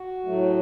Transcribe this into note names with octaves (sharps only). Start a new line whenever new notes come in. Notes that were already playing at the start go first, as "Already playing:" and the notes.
Already playing: F#4
A2 F#3 A3